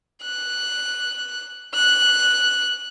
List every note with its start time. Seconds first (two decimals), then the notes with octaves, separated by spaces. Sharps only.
0.23 F#6
1.74 F#6